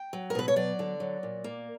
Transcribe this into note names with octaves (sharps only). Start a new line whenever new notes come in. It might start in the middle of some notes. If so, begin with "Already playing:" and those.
Already playing: G5
F#3
A#4
B2 B4
C#5
F#3 D5
D3
F#3
A#2
A#3